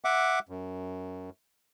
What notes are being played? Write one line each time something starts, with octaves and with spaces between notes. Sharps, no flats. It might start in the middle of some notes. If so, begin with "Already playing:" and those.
E5 F#5 D6
F#2